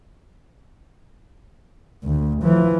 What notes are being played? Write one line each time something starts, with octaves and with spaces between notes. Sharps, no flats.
D2
E3 F3